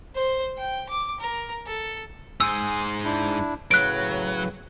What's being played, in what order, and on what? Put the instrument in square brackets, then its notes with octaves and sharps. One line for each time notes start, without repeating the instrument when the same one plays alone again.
[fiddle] C5
G5
D6
A#4
A4
[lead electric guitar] G#2 C5 [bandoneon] G#5 D#6 [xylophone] E6
[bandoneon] D4 E4
[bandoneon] A2 C#3 B4 [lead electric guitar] F#3 [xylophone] F#6 D7